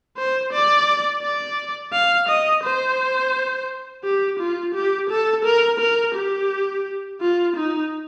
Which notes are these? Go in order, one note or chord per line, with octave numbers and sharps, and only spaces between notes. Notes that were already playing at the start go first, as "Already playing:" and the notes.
C5
D5
D5
F5
D#5
C5
G4
F4
G4
A4
A#4
A#4
G4
F4
D#4